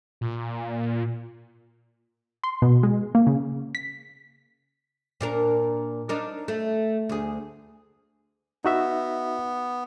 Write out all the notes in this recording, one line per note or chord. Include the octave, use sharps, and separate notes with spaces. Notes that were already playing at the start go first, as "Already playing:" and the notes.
A#2
C6
B2
G#3
A#3
C#3
B6
A#2 D4 A#4
D4 D#4 A#4
A3
D2 G#4
B3 D#4 F#4 E5